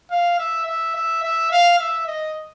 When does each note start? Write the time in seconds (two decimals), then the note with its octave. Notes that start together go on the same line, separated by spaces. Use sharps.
0.10 F5
0.38 E5
0.66 E5
0.95 E5
1.23 E5
1.51 F5
1.79 E5
2.07 D#5